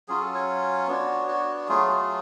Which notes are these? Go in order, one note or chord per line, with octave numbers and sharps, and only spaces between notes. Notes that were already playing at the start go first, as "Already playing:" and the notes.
F#3 C#4 F4 G#4
A4
C#5
B3 D4 F#4
F#4
F#4
F#3 A3 F4 G#4
G#4